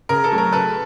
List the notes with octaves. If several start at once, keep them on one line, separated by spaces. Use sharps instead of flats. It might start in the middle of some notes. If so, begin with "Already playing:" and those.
C#3 A#4
A4
F#3 A3
A#4
C#3 A4 B4